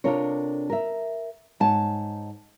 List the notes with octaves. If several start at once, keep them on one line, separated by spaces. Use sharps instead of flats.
C3 D4 F4 A4 A#4 C#5
A#4 E5
G#2 C#5 F#5 G#5 A5